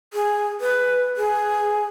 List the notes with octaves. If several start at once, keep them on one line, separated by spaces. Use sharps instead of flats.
G#4
B4
G#4